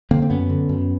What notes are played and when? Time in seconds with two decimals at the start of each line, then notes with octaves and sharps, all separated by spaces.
0.11 D3 A#3 C4
0.22 C4
0.30 F#2 B3 C#4
0.50 D3
0.69 F#2